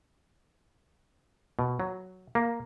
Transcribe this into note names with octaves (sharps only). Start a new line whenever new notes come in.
B2
F#3
A#3